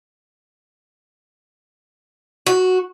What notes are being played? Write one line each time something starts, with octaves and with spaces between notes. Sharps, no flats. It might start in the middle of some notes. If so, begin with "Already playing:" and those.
F#4